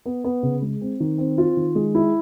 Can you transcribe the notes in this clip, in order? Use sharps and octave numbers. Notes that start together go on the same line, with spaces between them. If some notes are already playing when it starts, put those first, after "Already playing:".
B3
B3
C#3
G#3
C4
D#3
C4
F4
D#3
G#3
E4